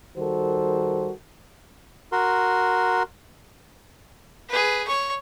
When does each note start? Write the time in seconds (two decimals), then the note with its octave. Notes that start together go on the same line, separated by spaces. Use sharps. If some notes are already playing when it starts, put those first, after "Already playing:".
0.17 D#3 G3 F#4 A4 A#4 C5
2.12 F#4 A#4 C6
4.49 G#4 B4
4.88 C#5 C#6